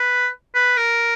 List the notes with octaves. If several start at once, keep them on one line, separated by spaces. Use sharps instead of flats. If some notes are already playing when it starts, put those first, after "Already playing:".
Already playing: B4
B4
A#4